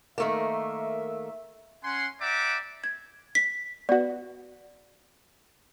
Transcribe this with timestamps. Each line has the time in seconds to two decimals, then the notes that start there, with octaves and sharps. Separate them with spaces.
0.18 D#3 A3 A#3 E5
1.84 C#4 F#5 G#5 C6
2.21 D5 E5 F#5 G5 A#5 D6
2.84 G#6
3.35 B6
3.89 B3 F#4 D5